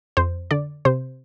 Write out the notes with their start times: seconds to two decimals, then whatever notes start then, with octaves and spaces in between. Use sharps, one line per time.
0.17 F2 C5
0.51 D3 D5
0.85 C3 C5